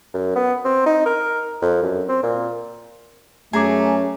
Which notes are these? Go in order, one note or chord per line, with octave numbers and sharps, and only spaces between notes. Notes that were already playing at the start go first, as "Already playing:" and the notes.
F#2
B3
C4
D#4
A#4
F2
F#2
C4
A#2
F#2 A3 C#4 G#4 G#5 A#5 D6